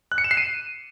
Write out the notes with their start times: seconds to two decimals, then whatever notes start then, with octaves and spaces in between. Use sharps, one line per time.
0.12 F#6
0.18 C#7
0.24 E7
0.31 C7
0.37 D#7